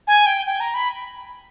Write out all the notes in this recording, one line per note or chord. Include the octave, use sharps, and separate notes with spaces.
G#5
G5
G5
A#5
B5